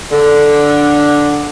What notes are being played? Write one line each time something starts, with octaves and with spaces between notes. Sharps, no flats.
D3